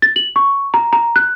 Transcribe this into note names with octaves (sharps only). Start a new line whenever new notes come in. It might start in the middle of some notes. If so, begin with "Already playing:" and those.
A6
F#7
C#6
A#5
A#5
F#6